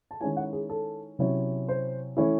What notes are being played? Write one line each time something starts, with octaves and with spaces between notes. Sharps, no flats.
A5
D#3 G#3 C#4 E4 G#5
F#5
G#4
A4
C3 F#3 C#4 E4
C5
E3 A3 C#4 E4